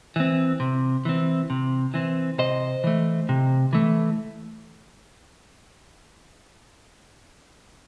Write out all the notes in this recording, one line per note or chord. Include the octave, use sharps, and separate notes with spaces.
E3 C4
C3
E3 C4
C3
E3 C4
C3 C5 D#5
E3 A3
C3
E3 A3